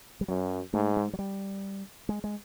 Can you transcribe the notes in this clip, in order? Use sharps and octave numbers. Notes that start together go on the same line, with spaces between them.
G3
F#2 F#3
G#2 A3
G#3
F#3
G3
G#3
G#3